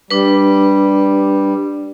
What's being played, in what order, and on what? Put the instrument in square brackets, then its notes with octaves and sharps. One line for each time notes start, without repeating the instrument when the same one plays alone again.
[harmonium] G3 [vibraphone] D4 B4